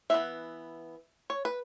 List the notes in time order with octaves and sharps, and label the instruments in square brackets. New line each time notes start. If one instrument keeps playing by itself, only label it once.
[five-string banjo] E3 B3 E5
C#5
B4